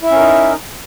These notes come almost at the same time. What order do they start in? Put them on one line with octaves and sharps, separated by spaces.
E4 E5 C#4 A#4 D#4